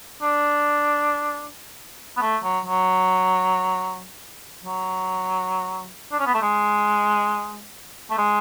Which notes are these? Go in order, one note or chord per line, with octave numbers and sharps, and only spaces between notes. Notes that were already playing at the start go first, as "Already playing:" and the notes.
D4
B3
A3
F#3
F#3
F#3
D4
C#4
B3
A3
G#3
A3
G#3